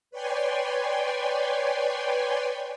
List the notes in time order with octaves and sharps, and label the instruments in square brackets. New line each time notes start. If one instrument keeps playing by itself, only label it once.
[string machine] B4 C#5 D5 G5 G#5 C6